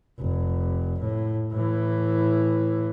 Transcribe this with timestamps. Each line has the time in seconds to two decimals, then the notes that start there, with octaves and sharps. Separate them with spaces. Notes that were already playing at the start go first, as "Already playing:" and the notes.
0.20 F1
1.01 A2
1.52 A2 E3